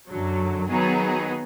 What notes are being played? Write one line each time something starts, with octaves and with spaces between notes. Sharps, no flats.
F#2 D3 F#3
D#3 F#3 B3 D#4 G#4